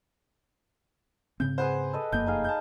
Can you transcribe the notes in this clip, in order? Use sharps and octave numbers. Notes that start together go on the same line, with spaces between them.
G#2 C#3 C4 G6
G#4 B4 C5 F#5
A4 B4 D#5
F1 F#2 A#3 G6
D#4 G#4 F5
A5 G6